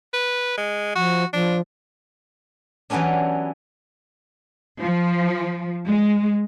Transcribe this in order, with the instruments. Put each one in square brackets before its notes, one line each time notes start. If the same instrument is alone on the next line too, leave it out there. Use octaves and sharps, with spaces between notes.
[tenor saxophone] B4
G#3
[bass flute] F3 [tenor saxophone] F#4
[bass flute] F3 [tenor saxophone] D4
[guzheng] E3 F#3 G3 B3 C#4 D4
[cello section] F3
G#3